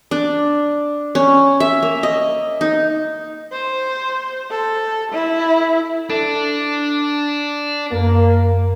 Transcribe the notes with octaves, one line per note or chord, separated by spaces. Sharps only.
D4
C#4
E5
A#3
D#5
D#4
C5
A4
E4
D4 A4
F#2 A#3